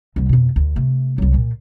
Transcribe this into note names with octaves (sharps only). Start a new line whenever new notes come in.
C2 D3
F2 B2
D2
C3 A3
C2 F#3
A#2